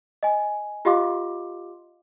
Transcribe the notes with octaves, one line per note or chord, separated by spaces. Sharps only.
D#5 G#5
F4 G4 D#5 F5 C6 D6